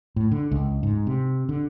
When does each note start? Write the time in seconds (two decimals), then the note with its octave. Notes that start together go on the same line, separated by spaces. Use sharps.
0.16 A2
0.32 D3
0.51 C#2
0.83 G#2
1.07 C3
1.49 D3